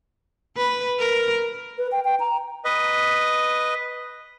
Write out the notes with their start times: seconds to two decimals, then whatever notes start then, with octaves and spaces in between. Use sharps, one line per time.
0.57 B4
0.99 A#4
1.78 B4
1.92 G5
2.05 G5
2.20 A#5
2.65 B4 D#5